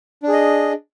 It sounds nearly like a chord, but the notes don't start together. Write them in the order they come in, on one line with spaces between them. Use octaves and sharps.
D4 G#4 D#5